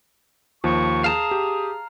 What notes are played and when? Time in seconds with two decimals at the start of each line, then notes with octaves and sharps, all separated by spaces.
0.64 D#2 F3 C#6
1.04 G#4 F5 A5 A#5
1.31 G4